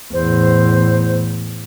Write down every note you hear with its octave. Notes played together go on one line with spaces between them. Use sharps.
E2 A2 C5